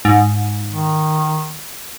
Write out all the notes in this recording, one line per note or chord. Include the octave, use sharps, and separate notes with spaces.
G#2
D#3